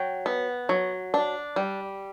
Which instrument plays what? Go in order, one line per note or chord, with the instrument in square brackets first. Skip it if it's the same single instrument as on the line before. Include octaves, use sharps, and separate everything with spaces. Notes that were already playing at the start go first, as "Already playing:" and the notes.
Already playing: [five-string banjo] F#3 G5
B3
F#3
D4
G3